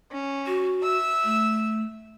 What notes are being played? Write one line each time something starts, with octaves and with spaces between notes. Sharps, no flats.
C#4
F#4
E5 E6
A3